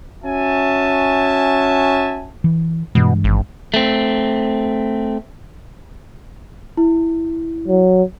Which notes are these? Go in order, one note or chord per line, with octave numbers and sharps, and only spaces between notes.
C#4 F#4 E5 G#5 A5
E3
G2 B2 E3 G#3
G#1
A3 C4
E4
F#3